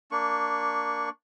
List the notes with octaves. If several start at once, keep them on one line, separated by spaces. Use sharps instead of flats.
A#3 D4 C#6